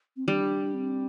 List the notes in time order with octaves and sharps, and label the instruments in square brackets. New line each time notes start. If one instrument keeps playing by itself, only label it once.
[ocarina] C4
[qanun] G3 [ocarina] D4
[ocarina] C4